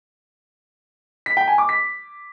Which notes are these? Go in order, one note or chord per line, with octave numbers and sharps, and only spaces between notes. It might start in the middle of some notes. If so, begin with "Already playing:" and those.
B6
G5
G#5
D6
B6